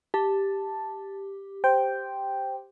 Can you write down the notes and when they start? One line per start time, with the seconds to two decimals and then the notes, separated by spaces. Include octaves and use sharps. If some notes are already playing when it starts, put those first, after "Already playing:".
0.14 G4 A5
1.64 C5 G5